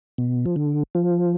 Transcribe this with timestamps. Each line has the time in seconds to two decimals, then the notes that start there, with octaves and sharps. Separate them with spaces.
0.18 B2
0.46 F3
0.56 D3
0.95 F3